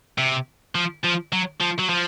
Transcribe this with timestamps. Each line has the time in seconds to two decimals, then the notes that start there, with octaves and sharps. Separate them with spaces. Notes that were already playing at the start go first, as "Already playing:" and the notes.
0.18 C3
0.75 F3
1.04 F3
1.32 F#3
1.61 F3
1.79 F#3
1.89 F3